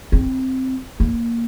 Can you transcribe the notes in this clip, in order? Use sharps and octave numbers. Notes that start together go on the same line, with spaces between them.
C4
A#3